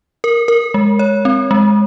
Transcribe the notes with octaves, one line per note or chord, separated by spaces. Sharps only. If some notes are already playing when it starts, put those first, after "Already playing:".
A#4
A#4
G#3
C#5
C4
G#3